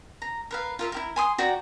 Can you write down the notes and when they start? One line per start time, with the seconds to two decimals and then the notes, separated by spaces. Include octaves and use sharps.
0.22 A#5
0.51 A#4 B4 F5
0.79 F4 A#4 E5
0.92 E4 G4 A#4
1.16 G#5 C6 D#6
1.38 F#4 D5 G5 A#5